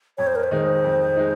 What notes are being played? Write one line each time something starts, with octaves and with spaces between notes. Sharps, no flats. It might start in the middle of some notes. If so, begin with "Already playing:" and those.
F2 C#5
C5
A#4
C5
D#3 G#3 D#4
F2
G#3 D#4